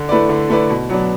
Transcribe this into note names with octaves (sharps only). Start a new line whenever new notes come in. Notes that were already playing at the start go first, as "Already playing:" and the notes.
Already playing: D3
A3 E4 B4 D5
D3
A3 E4 B4 D5
B2
F#3 B3 D4